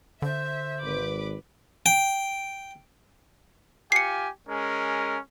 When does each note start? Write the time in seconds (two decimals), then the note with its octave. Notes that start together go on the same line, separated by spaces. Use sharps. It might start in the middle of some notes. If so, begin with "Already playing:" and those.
0.22 D3 C5 E5
0.83 G#1 B4 B5 D6
1.86 G5
3.92 F4 G4 G#5 C7 C#7
4.48 G#3 C#4 A#4